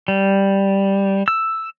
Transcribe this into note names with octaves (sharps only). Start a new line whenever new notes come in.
G3
E6